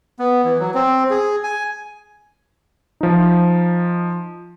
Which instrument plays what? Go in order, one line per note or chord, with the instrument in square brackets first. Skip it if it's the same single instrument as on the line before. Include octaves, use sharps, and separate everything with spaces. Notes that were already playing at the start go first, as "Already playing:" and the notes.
[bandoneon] B3
E3
F#3
C4
G#4
G#5
[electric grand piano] F3 D#4